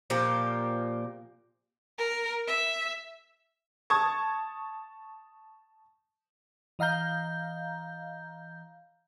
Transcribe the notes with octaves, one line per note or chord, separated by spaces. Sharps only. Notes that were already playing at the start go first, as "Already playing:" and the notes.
A#2 F3 A#3 G4
A#4
E5
A5 C#6 D#6 G#6
E3 D#5 F5 A#5 G6